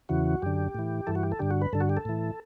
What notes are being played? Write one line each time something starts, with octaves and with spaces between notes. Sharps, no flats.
E2 C#3 E3 F#4
F#2 D3 G4
A2 E3
G2 E3 A4
F#4
G4
A4
G2 D3 G4
F#4
B4
G2 D3 A4
F#4
G4
A4
A2 E3